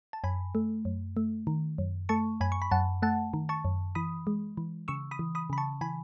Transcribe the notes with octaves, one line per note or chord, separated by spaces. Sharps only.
A5
F#2 G#5 B5
A3
F#2
A3
D#3
F#2
A3 A5 C#6
F#2 G#5 B5
C#6
B5
F#2 F#5 A5
A3 F#5 A5
D#3
A5 C#6
F#2
E3 B5 D#6
G#3
E3
C#3 C#6 E6
B5 D#6
E3
B5 D#6
C#3 B5
A5 C#6
E3 G#5 B5